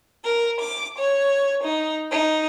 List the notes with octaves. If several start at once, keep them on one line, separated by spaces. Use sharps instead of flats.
A#4
D6
C#5
D#4
D#4